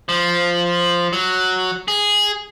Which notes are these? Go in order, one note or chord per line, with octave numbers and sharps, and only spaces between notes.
F3
F#3
G#4